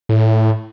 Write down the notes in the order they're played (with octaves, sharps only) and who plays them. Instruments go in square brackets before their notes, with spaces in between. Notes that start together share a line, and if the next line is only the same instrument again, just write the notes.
[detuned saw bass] A2